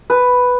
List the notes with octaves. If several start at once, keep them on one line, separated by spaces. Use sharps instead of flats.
B4